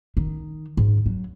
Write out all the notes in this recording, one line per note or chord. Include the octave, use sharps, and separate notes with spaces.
D#3
G#2
F#3